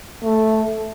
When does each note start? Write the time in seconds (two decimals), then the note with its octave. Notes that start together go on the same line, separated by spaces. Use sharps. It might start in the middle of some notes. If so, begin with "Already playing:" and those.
0.24 A3